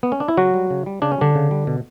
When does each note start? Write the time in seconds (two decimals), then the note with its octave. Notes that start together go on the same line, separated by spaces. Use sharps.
0.03 B3
0.12 C#4
0.20 D4
0.28 E4
0.37 C#3 F#3 F#4
0.54 G3
0.70 C#3
0.86 G3
1.02 C#3 D4
1.12 C#4
1.18 D3 G3 D4
1.35 C#3
1.51 G3
1.67 B2